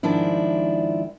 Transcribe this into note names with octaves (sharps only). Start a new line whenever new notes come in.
G#2 D#3 F3 D4 E4